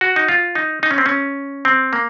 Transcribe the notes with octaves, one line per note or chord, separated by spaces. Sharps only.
F#4
D#4
F4
D#4
D#4
C#4
C4
C#4
C4
A#3